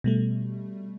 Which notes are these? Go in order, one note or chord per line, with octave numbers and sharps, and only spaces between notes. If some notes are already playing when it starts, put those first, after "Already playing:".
B2 G3 A3